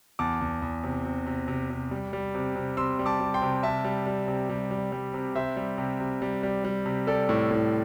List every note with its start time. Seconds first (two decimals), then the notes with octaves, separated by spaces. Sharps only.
0.19 E2 A5 D6
0.41 E2
0.62 E2
0.84 C3
1.05 C3
1.26 C3
1.48 C3
1.70 C3
1.91 G3
2.13 G3
2.35 C3
2.56 C3
2.77 C3 C6 E6
2.99 G3
3.06 A5 D6
3.20 G3
3.34 G5 C6
3.42 C3
3.63 C3 E5 A5
3.84 G3
4.06 G3
4.28 C3
4.49 G3
4.71 G3
4.92 G3
5.14 C3
5.35 C3 C5 E5
5.57 G3
5.78 C3
6.00 C3
6.22 G3
6.43 G3
6.65 G3
6.86 C3
7.07 G3 A4 D5
7.29 A2
7.51 A2